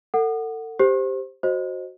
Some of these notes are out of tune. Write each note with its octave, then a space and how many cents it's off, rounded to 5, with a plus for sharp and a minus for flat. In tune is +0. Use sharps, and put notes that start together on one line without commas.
A4 +35 F#5 +0
G4 +0 C5 +0
F#4 +0 C5 +15 D#5 +0